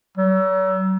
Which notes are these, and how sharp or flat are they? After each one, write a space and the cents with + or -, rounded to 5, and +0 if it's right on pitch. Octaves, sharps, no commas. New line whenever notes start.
F#3 +40